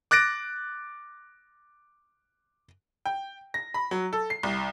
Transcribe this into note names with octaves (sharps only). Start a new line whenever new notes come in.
D6 F#6 A6 A#6 D7
G5
A#6
B5
F#3
A4
C7
C2